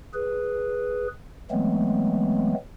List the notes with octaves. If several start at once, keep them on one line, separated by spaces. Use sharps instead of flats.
G#4 B4
E3 F#3 G#3 A3 B3 C4